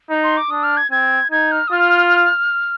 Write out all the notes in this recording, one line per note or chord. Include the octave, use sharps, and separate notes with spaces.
D#4
C6
D6
D4 D#6
F6
G#6
C4 G#6
D#4 G#6
F6
D#6
F4 F6